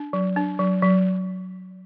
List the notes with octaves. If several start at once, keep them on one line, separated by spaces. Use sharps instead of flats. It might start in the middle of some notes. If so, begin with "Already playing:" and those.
Already playing: D4
F#3
D4
F#3
F#3